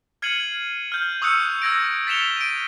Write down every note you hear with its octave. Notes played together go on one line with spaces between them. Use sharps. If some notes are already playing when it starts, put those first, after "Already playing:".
F6 G#6 C7 C#7 D#7 F#7
F6 G6
C#6 D#6 E6 F#6 G6 C#7
E6 G#6 A#6 D7
A6 B6 C#7 E7 F7 G7
D7 D#7